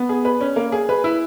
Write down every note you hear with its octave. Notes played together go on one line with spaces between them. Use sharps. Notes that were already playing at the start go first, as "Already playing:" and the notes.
Already playing: B3
G#4
B4
C#4
A#3
G#4
B4
E4